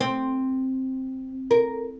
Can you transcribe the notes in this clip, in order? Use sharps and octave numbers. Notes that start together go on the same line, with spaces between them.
C4
A#4